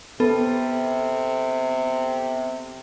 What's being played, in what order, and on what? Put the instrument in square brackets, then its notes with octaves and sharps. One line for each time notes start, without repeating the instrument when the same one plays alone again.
[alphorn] C3 [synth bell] B3 A4